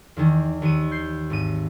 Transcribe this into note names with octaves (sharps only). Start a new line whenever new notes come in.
E2 D#3
D#2 C#7 D#7
G6 C7
G#1 D#7